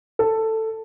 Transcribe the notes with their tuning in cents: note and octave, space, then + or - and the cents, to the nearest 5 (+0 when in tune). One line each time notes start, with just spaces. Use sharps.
A4 +10